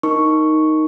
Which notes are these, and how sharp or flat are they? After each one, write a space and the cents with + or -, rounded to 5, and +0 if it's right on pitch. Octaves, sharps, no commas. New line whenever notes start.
D#4 +5 A#4 +0 C#6 +0